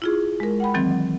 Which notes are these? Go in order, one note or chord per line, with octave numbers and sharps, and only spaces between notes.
E4 F4 G#4
G#3 A#4
F#5 G5 B5
D#3 E3 F#3 C4